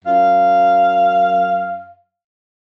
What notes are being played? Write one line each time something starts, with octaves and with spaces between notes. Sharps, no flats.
F#2 F5